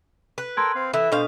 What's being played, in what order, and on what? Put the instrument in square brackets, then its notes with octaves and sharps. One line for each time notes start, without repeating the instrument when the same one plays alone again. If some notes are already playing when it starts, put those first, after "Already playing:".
[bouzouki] B4
[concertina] A4 A#4 G5 [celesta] C6 G#6
[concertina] C4 F5
[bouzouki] E3 [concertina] E4 E5 [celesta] A4
[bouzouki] B2 F5 [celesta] D4 A4 [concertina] C5